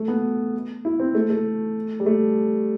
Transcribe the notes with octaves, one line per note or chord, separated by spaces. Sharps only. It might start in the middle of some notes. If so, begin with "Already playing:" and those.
Already playing: A3
B3
E4
C4
A3
A3
G3
A3